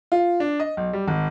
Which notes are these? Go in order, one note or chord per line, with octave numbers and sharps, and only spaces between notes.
F4
D4
D#5
B1
G3
G#1